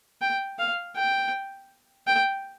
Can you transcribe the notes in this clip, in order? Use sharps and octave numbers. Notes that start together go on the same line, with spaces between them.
G5
F5
G5
G5